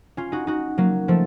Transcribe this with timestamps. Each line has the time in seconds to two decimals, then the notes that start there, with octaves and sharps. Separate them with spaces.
0.17 C#4 F4
0.32 D#4 F#4
0.47 D#4 F#4
0.78 F#3 A#3
1.08 F3 A3